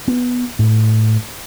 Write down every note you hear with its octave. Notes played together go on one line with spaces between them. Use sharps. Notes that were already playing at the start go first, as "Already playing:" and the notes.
B3
A2